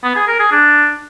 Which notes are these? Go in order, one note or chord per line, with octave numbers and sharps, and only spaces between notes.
B3
G#4
A#4
G#4
D4